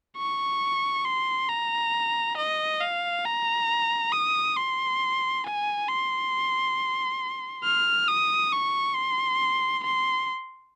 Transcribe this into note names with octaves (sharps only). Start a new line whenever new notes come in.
C#6
C6
A#5
D#5
F5
A#5
D#6
C6
G#5
C6
F6
D#6
C#6
C6
C6